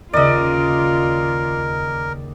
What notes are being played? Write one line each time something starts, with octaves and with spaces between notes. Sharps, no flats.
D#2 C#3 F4 A#4 D5 D#5